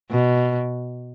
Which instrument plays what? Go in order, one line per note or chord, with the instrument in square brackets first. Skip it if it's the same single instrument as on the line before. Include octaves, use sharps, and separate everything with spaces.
[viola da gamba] B2